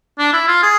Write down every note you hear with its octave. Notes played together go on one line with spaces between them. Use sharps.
D4
E4
F4
G#4